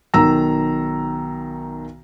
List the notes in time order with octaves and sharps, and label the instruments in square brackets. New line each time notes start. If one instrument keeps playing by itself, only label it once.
[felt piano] B1 D#3 A#5 E6 A#6